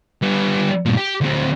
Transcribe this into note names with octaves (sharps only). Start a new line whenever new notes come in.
G3 B3
G2 A#2
G4
D2 C4